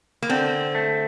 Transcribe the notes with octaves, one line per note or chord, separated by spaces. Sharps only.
A#3
D3 C4
A3